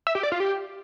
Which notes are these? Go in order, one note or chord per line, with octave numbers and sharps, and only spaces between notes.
E5
G4
D5
F4
G4